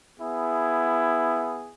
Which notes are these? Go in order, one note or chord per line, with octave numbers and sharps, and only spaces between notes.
B3 E4 G#4